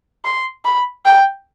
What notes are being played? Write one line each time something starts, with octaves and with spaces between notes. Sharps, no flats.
C6
B5
G5